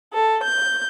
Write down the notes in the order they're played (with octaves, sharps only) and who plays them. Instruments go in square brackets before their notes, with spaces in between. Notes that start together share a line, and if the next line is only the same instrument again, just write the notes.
[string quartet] A4
G6